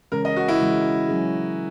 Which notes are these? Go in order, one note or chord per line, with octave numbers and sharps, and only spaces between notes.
C#3 E3 G#3 C#4 A#4
D#5
F#4
E4
C#3 E3 G#3 C#4
F#3 C#4 G#4